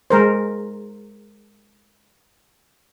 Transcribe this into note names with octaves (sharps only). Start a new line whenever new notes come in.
G#3 A#4 C5